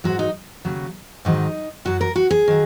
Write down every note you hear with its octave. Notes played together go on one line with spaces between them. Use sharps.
G#2 F#3 F#4
D#4
D#2 C#3 F#3
G#2 D#3 F#3 D#4
F#2 F#3 F#4
A#4
F#4
G#4
D#3 F#3